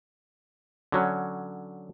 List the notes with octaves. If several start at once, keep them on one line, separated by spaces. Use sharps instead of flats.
D3 F#3 C#4